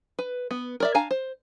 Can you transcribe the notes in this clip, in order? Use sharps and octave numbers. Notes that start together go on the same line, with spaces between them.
B4
B3
A#4 D5 E5
D4 F5 G#5 A#5
C5